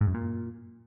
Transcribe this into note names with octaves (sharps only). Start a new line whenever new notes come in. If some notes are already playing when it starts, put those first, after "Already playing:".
G#2
F#2
A#2